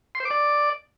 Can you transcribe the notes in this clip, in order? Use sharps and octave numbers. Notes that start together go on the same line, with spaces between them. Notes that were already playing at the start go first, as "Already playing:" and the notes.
C6
C5
D6
D5